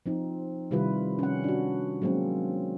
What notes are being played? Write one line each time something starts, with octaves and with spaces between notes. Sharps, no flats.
F3 C4 D#4
C3 D#3 G3 E4 F4 B4
C#4 F#5
D4 F#4
F#3 G#3 A#3 C4 C#4